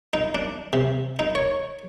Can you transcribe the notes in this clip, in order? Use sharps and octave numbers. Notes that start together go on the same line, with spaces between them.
D#4
D4
C3
D#4
C#5